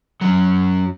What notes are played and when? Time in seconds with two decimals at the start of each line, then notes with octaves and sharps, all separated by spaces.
0.21 F#2 F#3